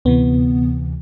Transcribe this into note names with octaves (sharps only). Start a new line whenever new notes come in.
D2 C3 E3 B3